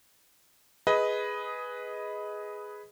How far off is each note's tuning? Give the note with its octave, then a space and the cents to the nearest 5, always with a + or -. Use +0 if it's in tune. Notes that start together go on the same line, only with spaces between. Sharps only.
G#4 +0 B4 +0 D#5 +15